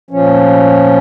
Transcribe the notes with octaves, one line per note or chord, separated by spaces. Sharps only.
A#2 F3 C#4